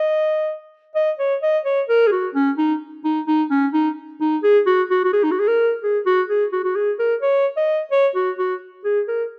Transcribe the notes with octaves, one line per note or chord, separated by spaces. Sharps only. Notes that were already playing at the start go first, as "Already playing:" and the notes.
Already playing: D#5
D#5
C#5
D#5
C#5
A#4
G#4
F#4
C#4
D#4
D#4
D#4
C#4
D#4
D#4
G#4
F#4
F#4
F#4
G#4
D#4
F#4
G#4
A#4
G#4
F#4
G#4
F#4
F#4
G#4
A#4
C#5
D#5
C#5
F#4
F#4
G#4
A#4